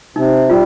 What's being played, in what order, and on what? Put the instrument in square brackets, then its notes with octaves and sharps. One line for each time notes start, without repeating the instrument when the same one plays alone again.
[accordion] C3 [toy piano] D#4
[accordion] G3 [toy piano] F4